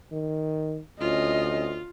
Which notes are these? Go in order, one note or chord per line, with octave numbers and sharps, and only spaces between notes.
D#3
D2 C#4 F4 D#5